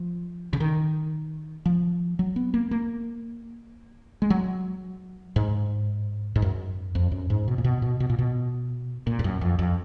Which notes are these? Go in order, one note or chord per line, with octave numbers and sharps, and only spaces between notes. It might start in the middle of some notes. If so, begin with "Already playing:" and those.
Already playing: F3
C#3
D#3
F3
F#3
B3
A#3
A#3
G#3
F#3
G#2
G#2
F#2
F2
F#2
G#2
B2
A#2
B2
B2
B2
A#2
B2
A#2
G#2
F#2
F2
F2